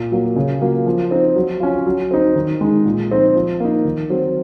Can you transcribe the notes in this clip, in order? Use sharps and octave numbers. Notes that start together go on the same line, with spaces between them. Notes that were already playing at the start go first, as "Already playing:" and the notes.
Already playing: A#2
F#3 A#3
C#3
F#3 A#3 F4
F3
C4 D#4
F#3
C#4 F4
F#3
C4 D#4
D#3
G#3 D#4
A#2
F3 C4 D#4
F3
A#3 D#4
D#3
F#3 C4